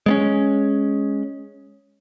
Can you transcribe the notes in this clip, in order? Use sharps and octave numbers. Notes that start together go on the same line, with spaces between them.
G#3 B3 C#4